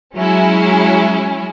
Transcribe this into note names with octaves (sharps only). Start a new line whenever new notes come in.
F#3 G#3 C#4 E4